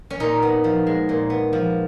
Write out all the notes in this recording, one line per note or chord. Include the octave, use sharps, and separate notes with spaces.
C#4
A#2 D#4
B3
F3
G#3
A#2
B3
F3